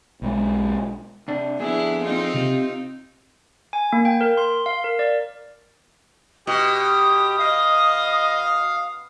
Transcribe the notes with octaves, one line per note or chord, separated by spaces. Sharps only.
B1 G#3
C3 D4
F2 B3 D4 E4 G#4
C4 D#4 F4
C3
G#5
A#3
G5
A#4
C6
F5
A#4
D5
B2 G4 D#6
D#5 F5